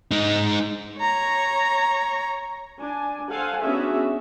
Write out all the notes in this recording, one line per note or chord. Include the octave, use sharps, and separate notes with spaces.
G#3 D#4
C#5 A#5
D4 G#5
A4 C5 F5 F#5 G#5
B3 C#4 D4 F#4 G#4 E5